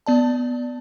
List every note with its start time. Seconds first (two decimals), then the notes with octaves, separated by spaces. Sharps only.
0.06 B3 D5 A5